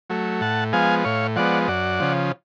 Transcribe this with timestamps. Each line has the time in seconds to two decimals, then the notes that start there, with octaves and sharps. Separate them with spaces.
0.10 F#3 A3
0.41 A2 F#5 A5
0.73 F3 G#3 B3 F5 G#5
1.05 A2 C#5 F5
1.36 F3 G#3 B3 D5 F#5
1.68 F#2 D5 F#5
2.00 C#3 F3